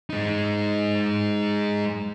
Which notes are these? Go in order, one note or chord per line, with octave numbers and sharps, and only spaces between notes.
G#3 D#4